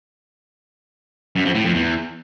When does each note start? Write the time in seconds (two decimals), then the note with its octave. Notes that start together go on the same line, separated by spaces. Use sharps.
1.36 F#2
1.45 F2
1.55 A2
1.64 F2
1.74 E2